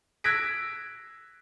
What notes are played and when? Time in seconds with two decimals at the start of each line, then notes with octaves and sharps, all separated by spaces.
0.24 E6 F#6 G#6 A#6 B6 D7